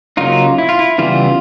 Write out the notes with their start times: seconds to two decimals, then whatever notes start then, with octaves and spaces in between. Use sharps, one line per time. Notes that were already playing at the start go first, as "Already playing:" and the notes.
0.17 C#3 F#3 A#3 D#4 F4
0.58 E4
0.69 F4
0.79 E4
0.98 C#3 E3 G3 B3 F4